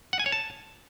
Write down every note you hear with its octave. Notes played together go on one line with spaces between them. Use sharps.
F#5
G#5
C#5
A5